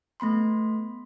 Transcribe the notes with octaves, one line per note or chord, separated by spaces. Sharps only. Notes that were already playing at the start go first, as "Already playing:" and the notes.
A3 B3 B5 C6